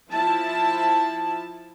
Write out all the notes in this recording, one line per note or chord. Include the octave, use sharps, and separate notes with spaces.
F3 E4 A5